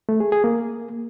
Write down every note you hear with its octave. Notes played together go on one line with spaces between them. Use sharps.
A3
G#4
G#4
A#3